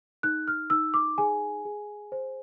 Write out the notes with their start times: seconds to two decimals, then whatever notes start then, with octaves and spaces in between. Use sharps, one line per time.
0.23 D#4 F#6
0.48 F6
0.70 D#4 E6
0.94 D6
1.18 G#4 G#5
1.65 G#4
2.12 C5